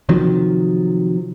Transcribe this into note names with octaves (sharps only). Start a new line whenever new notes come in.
C3 D#3 F3 F#3